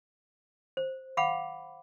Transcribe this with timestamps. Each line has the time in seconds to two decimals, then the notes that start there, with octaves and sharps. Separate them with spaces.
0.77 C5
1.17 F5 F#5 B5 D6